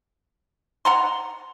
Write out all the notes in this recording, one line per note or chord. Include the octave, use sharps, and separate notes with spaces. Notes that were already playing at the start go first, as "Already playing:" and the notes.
F#5 A#5 C6